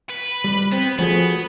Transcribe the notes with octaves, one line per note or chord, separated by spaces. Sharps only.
B4
G3
B3 C4
F3 A3 B3 F#4 G#4